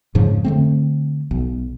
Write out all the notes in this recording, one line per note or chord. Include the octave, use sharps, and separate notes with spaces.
F2 G#2 C#3 F3
D3 A3 C4
B1